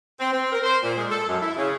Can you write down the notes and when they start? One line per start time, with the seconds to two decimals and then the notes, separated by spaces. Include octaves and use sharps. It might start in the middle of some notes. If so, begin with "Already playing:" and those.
0.20 C4
0.32 C4
0.52 A#4
0.63 C5
0.83 A#2
0.96 G#3
1.10 A4
1.28 F#2
1.41 E4
1.56 C#3